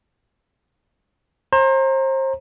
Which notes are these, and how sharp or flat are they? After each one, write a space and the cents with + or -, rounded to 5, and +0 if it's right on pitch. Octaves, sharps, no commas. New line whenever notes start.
C5 +35 A#5 -5